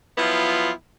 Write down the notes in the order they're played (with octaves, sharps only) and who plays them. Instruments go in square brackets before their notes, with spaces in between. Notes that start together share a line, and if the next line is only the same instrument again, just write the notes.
[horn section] F3 F#3 B3 E4 F4